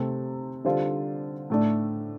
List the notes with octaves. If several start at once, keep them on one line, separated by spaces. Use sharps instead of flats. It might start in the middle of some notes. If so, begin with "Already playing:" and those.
Already playing: C3 A3 C4 A4
D3 G3 F4 A4 C5
A2 A3 D4